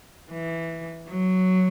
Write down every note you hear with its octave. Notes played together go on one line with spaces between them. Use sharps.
E3
F#3